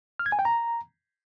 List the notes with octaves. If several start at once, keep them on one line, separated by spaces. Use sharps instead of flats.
F6
G#6
G#5
G5
A#5